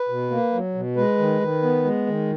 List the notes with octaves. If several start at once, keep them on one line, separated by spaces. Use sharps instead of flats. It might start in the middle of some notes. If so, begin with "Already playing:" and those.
Already playing: B4
B2
A#3
F#3
B2
G#3 B4
D#3
D#3
B3
G#3
D#3